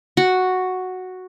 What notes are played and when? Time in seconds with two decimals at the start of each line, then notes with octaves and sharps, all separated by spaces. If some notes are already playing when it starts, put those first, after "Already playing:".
0.17 F#4